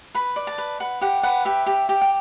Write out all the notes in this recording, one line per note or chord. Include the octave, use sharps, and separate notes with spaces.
B4 B5
D5
A5
B4
B4 F#5
G4 F#5
B4 F#5
G4 E5
G4
G4
G5